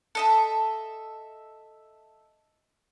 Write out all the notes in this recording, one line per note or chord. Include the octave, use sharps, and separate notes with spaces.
A4 D#5 E5